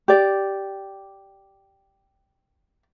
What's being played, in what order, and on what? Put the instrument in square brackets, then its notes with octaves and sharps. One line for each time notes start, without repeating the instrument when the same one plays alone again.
[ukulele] G4 D5